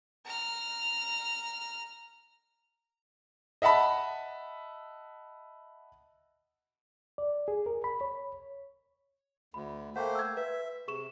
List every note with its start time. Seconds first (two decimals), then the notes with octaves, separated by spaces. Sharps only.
0.25 A#5 F6
3.62 D#5 E5 F#5 A5 B5
7.18 D5
7.48 G#4
7.66 A#4
7.84 B5
8.01 C#5
9.54 D2 B5
9.96 A3 A#3 C5 F#5 G5
10.15 E6 G#6
10.37 B4 E5
10.88 C3 G#4 C#6 E7